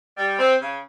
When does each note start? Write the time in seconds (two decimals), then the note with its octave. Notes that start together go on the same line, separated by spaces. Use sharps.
0.17 G3
0.39 C4
0.61 C#3